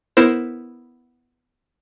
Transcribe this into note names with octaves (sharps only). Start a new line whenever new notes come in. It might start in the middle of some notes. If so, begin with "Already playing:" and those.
B3 E4 A#4 C5